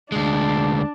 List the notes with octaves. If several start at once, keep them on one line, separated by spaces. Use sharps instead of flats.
D2 G#3 D4